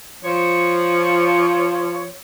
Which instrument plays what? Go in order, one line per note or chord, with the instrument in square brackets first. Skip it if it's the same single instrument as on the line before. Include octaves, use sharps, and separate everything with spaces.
[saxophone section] F3 C#5